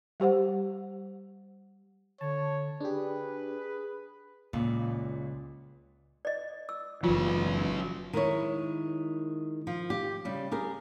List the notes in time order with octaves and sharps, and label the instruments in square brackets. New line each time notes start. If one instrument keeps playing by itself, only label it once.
[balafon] G3 G4 C5 F#5
[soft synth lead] D3 [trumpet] C#5 [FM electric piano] A5
[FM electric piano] D4 G4 [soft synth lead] G#4 [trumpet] B4
[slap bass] C#2 [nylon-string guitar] A#2
[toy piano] D5 D#5
E6
[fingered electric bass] F#1 E3 [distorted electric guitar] F#3 B4 [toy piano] F4
[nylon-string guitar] D#3 G#3 E4 C#5
F3
G4
C#3 G3
G4 G#4 A#4